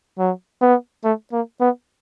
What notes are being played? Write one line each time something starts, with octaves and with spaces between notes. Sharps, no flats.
F#3
B3
A3
A#3
B3